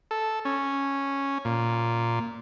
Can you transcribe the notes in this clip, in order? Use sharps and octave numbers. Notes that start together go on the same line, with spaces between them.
A4
C#4
A#2